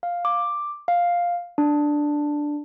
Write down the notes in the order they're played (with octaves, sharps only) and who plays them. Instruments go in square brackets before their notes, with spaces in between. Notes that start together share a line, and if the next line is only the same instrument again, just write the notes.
[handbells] F5
D6
F5
D4